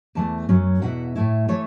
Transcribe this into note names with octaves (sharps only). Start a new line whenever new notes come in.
E2 E3 A3 A5
F#2 F#3 C#4
E2 B2 B3 E4 F#5
A2 A3 E4
E3 A3 C#5